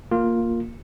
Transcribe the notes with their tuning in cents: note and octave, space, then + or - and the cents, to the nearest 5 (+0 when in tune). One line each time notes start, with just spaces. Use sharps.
A#3 -5 F4 +5